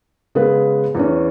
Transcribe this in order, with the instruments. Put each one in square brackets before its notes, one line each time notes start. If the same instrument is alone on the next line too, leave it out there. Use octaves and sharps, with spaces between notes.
[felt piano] C#3 G#3 B3 G#4 B4
E2 E3 C#4